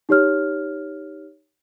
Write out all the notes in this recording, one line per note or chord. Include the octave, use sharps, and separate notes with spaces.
D#4 G4 C#5 F6